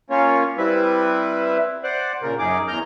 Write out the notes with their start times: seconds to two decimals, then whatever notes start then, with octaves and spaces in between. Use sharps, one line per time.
0.10 A#3 C#4 F4 C#5
0.58 G3 C4 E4 B4 E5
1.84 C5 D5 F#5
2.22 A#2 C#3 A#4
2.39 F#2 D#4 G#4 D6
2.68 E2 A#5 F6 G6